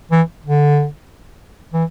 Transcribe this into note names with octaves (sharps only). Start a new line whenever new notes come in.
E3
D3
E3